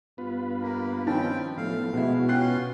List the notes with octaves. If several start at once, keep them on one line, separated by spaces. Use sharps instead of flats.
G2 B3 F4 B4
A#3 A#4
D#3 F3 C4 C#4 G5 A5
A2 F3 A3 B3 F5
B2 G#3 B3 E4 F#4
C#4 F4 G5 C6 F#6 C7